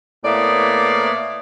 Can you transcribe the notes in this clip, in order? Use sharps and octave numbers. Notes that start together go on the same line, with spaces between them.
A2 A#3 B3 E4 D5